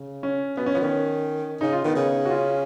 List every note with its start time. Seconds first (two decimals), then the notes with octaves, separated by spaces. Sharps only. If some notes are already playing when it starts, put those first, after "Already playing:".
Already playing: C#3
0.23 C#4
0.57 B2 B3
0.66 C#4
0.74 F3 B3
0.80 D#3 C#4
1.61 C#3 D#4
1.73 F4
1.84 D#3 B3 D#4
1.96 C#3
2.25 F#4
2.30 C#4 F4